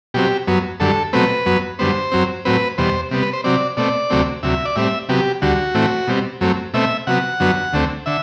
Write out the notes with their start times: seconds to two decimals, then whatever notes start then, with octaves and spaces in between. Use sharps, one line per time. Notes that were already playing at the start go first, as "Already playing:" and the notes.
0.14 B2 F#3 C4 G4
0.47 F#2 F#3 B3
0.80 F#2 D3 G3 A4
1.13 B2 F#3 A3 C4 B4
1.46 F#2 F#3 B3
1.79 F#2 D3 G3 B3 C5
2.12 F#2 F#3 C4
2.45 A2 F#3 C4 B4
2.78 E2 B2 G3 C5
3.11 C3 G3 B3
3.22 B4
3.33 C5
3.44 C3 F#3 C4 D5
3.77 B2 A3 C4 D5
4.10 D2 C3 F#3 A3 C4
4.43 D2 C3 F#3 E5
4.65 D5
4.76 A2 G3 C4 E5
5.09 C3 F#3 B3 G4
5.42 D2 D3 G3 F#4
5.74 A2 E3 A3 C4
6.07 B2 G3 C4
6.41 F#2 F#3 A3 C4
6.74 B2 A3 C4 E5
7.07 C3 F#3 B3 F#5
7.40 F#2 D3 F#3 B3
7.73 D2 D3 A3 C4
8.06 D3 E5